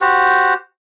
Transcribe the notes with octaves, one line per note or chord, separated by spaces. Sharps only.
F#4 G4 C5 F#5